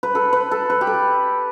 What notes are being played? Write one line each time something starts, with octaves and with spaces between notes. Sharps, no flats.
B4
A4
B4
A4
B4
G4
A4